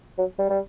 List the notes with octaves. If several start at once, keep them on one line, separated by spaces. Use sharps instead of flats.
F#3
G3
G3